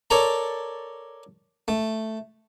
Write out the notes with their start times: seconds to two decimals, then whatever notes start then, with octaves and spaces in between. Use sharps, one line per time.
0.10 A4 A#4 C#5 D5 A5 A#5
1.68 A3